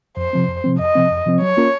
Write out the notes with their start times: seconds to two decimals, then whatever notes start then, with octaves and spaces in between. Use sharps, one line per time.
0.17 F2 C5
0.33 C3 F3 C4
0.48 F2
0.64 C3 F3 C4
0.79 F2 D#5
0.95 C3 F3 C4
1.10 F2
1.26 C3 F3 C4
1.42 F#3 C#5
1.57 A#3 C#4 F4 A#4